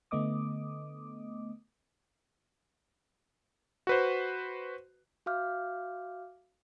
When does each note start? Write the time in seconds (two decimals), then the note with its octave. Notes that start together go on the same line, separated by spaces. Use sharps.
0.11 D3 A3 B3 D#5 D6 D#6
3.87 F#4 B4 C5
5.26 F#4 E5 F5 D6 F6 G6